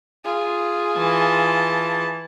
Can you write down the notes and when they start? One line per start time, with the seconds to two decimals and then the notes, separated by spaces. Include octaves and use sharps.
0.25 F4 G#4
0.97 E3 A5